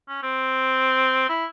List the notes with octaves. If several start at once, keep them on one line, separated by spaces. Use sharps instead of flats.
C#4
C4
E4